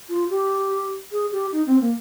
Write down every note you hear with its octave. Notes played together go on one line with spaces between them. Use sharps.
F4
G4
G#4
G4
D#4
C4
A#3